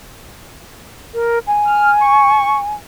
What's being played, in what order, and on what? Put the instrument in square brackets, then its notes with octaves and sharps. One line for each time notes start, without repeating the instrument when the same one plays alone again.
[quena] A#4
G#5
[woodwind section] F6
C#6